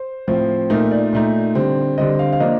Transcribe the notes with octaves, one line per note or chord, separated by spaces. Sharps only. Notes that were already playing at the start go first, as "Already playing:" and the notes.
Already playing: C5
A2 F3 C4
A#2 A3 D#4 A#4
D5
A#2 A3 D#4
D3 G3 C4
D3 G3 C4 D#5
F5
F5
F3 A#3 D4 D#5